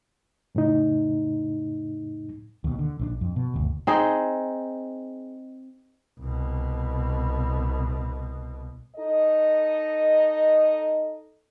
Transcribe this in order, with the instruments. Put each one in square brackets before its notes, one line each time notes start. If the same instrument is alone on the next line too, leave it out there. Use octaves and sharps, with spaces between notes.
[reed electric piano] F2 A2 C#3 D#4
[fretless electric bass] D#2 B2
D3
A#1 D3 D4
F2
B2
F#1 D2
[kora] C4 D#4 G#4
[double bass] C2 B2
[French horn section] D#4 A4 D#5